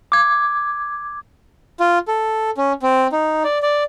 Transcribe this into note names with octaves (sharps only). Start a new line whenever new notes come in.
D6 G#6
F4
A4
C#4
C4
D#4
D5
D5